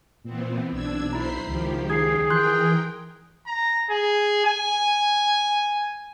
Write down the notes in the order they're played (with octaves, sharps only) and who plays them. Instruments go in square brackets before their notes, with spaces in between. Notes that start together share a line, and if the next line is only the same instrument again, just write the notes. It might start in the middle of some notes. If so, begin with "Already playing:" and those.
[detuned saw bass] A#2 [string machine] E3 B3 C4
[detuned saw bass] B1 [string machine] D4 E6 G#6
[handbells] E4 A#5 [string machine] C5 B5 C7
[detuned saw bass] C#2 [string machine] D#3 F3 G4
[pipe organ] G#4 [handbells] G#6 C7
[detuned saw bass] E3 [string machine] A#4 G5 [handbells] C6 F#6 G6
[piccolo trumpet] A#5
G#4
G#5